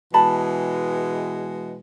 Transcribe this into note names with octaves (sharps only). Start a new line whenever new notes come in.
B2 E3 G#3 A5 B5